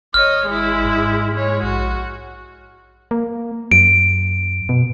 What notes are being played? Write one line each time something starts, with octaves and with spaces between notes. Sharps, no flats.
G#1 C#5 D#5 F6
G#3 E4
G#2
G#3 C#5
A#1 F#4
A#3
F#2 D7
B2